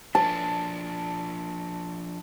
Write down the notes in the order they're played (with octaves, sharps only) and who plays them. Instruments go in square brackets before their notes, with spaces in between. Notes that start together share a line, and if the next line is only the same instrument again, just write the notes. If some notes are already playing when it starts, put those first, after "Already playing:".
[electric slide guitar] F3 D4 F4 [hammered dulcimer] A5